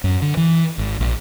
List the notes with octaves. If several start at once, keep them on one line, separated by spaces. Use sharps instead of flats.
F#2
D3
E3
G#1
A#1